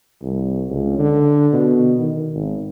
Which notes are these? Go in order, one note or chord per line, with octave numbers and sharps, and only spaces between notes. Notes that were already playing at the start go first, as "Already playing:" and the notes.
C2
C#2
D3
B2
D#3
G#1